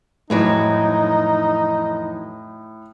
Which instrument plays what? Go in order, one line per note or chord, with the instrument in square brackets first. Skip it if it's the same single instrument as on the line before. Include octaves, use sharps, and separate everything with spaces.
[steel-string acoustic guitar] F2 E3 F#3 [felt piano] A2 [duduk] D#4